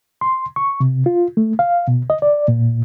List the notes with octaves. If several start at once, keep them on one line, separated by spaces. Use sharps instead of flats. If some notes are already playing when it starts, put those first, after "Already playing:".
C6
C#6
C3
F4
A3
F5
B2
D#5
D5
A#2